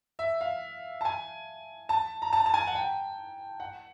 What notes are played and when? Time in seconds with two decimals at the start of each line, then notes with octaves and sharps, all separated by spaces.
0.19 E5
0.41 F5
1.01 A5
1.05 G#5
1.89 A5
2.22 A#5
2.33 A5
2.46 A5
2.54 G#5
2.67 F#5
2.75 G5
3.60 F#5